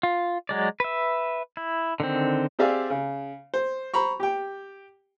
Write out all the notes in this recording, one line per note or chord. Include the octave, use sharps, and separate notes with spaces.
F4
F#3 G#3 D5
B4 E5
E4
D3 D#3 C4
C4 G4 G#4 D5 E5 F5
C#3
C5
C5 A#5 B5 C#6
G4 G5